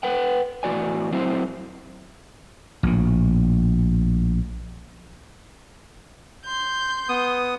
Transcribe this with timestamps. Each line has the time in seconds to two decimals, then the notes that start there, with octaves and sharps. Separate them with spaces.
0.03 B4 F#5 G5
0.63 E2 A2 F3 F#4 D5 G#5
1.12 F#3 C4 E4 C5
2.83 A#1 A2
6.46 C6 G6
7.09 B3 D#6